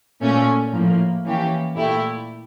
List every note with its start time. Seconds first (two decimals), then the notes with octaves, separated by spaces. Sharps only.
0.21 A#2 A3 C#4
0.72 A2 F3 A#3
1.24 E3 A#3 C#4 G4
1.76 A#2 A3 E4 G4